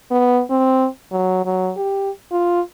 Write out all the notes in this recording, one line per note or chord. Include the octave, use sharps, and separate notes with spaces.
B3
C4
F#3
F#3
G4
F4